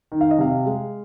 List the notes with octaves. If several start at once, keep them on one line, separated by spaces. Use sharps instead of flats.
D#3
F5
D#5
C3 F5
G#3